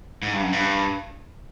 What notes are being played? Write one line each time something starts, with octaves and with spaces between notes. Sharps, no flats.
G#2
G2
F#2
G2